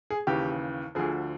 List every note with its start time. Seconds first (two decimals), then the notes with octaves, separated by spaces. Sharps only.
0.10 G#4
0.27 D#2 C#3 E3 G4
0.95 D2 D3 F3 G#4